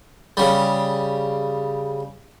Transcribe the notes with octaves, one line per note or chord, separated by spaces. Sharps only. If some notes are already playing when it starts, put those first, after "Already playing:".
C#3 G3